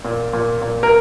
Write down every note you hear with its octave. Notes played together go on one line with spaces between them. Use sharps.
A#2
A#2
A#2
A#4